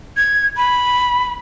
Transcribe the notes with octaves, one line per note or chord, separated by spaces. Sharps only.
G#6
B5